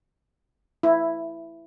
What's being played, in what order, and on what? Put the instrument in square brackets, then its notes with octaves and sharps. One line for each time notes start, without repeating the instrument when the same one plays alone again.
[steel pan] E4